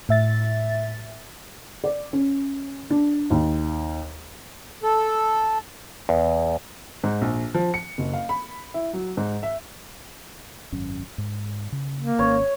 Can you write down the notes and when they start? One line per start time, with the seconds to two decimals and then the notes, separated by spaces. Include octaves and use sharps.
0.09 A2 E5 A6
1.84 D5
2.13 C#4
2.90 D4
3.30 D#2
4.83 A4
6.09 E2
7.04 G#2
7.21 A#1
7.55 F3
7.74 C#7
7.98 F#1
8.13 F5
8.29 B5
8.74 E4
8.93 F#3
9.17 G#2
9.43 E5
10.72 G#1 F#2 C#4
11.18 G#2
11.72 C#3
11.98 A#3
12.19 G#1 C#4 C#5